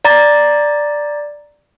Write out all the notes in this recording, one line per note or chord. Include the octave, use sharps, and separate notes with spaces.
D5 A#5 A6